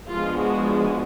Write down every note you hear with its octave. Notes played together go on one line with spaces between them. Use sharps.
F3 G#3 B3 D4 F4
F#4